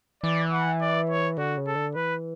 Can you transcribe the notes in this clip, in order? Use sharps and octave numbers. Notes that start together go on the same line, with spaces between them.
E3 D5
F#5
D5
C#5
D3 F#4
C#3
A4
D3
E3 B4